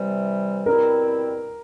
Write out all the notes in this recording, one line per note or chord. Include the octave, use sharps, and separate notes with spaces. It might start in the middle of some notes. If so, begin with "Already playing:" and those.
Already playing: C3 E3 G3
B2 G3 C4 E4 A#4